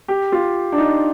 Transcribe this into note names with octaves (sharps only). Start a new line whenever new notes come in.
G4
F4
D4
D#4